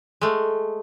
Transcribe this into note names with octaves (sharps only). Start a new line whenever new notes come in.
G#3 A3